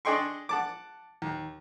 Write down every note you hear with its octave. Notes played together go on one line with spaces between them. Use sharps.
D4 G#4 D#5 G5 C6 C#6
F#5 A5 D6
D#2